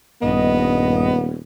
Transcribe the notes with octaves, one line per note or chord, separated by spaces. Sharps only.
D#1 A#1 G2 B3 D#5